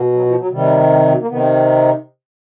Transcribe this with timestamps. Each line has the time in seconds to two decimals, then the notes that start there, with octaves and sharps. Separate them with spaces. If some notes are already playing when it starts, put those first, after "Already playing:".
Already playing: B2
0.13 F#3
0.26 F3
0.38 F#3
0.51 C3 D#3 G3
0.90 G3
1.00 G3
1.09 F#3
1.20 A#3
1.29 C3 D#3 B3